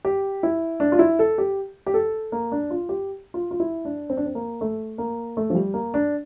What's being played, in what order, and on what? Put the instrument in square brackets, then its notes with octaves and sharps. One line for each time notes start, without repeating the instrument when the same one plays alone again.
[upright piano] G4
E4
D4
F4
E4
A4
G4
G4
A4
A#3
D4
F4
G4
F4
F4
E4
D4
C4
D4
C4
A#3
A3
A#3
A3
F3
G3
A#3
D4